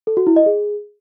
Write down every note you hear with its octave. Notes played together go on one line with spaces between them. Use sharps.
A4
F#4
E4
D#5
G#4